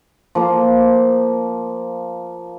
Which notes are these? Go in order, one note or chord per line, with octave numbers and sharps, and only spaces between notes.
F3 A#3